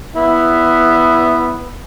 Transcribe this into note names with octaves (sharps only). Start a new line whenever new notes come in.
B3 E4